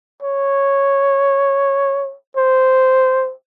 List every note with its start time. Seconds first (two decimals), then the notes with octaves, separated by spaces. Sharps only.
0.23 C#5
2.37 C5